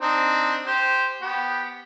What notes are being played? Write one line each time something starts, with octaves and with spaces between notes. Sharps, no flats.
C4 D4 D#4
G4 C5
B3 G4